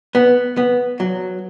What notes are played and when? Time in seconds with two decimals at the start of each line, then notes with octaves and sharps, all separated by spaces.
0.15 B3
0.57 B3
1.00 F#3